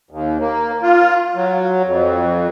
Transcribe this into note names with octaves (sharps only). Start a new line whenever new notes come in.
D#2
A#3
F4
F#3
F2